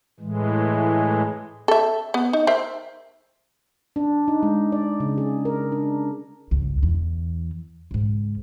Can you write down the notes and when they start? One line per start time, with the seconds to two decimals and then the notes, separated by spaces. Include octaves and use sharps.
0.20 A2 E3 G#3
1.68 A4 E5
2.14 B3
2.33 D#4
2.47 A#4 C5 E5
3.96 D4
4.28 D#4
4.43 G#3
4.72 D5
5.00 C#3
5.18 G#4
5.45 A#4
5.72 D4
6.51 C#2 G2
6.83 E2 E3
7.91 C#2 G#2